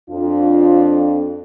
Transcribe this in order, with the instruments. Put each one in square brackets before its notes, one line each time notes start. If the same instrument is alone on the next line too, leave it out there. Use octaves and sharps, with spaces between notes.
[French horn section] F2 D4 F4